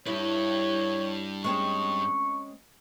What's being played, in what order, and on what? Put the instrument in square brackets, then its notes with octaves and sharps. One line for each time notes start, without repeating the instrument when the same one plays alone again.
[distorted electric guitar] G2 B4 [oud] E4 [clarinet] C#5
[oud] G#3 C4 C#4 [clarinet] C#6